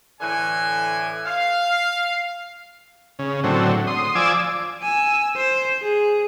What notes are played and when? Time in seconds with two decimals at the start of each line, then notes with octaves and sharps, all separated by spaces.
0.20 A2 D3 E3 G#5
1.26 F5
3.19 C#3
3.44 A2 D3 F#3 C4
3.87 C6 D#6
4.15 F3 D5 G#5 D6 E6
4.82 G#5 E6
5.36 C5
5.82 G#4